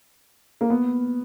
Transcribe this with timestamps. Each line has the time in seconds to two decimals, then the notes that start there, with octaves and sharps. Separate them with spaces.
0.61 A#3
0.70 B3